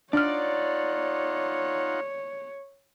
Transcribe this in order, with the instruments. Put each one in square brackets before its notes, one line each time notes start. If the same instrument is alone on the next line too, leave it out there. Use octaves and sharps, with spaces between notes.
[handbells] D4 F6 [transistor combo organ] D#4 F4 F#5 [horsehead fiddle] C#5 [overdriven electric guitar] D5